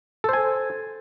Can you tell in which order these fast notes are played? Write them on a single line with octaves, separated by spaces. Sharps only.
A4 C5 G#5